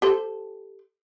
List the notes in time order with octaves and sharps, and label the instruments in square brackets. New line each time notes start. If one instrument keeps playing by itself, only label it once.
[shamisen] G4 A4 C5